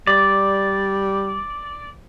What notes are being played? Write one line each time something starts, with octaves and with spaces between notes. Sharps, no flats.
G3 D5